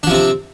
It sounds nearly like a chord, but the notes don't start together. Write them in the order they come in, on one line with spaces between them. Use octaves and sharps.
D4 F3 C3 C4